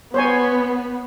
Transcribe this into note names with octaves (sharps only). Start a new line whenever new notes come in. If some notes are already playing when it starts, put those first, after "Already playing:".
B3 C5 C#5 G#5